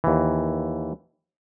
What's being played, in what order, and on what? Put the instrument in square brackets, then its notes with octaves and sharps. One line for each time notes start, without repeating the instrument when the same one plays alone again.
[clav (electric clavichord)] D#2 E3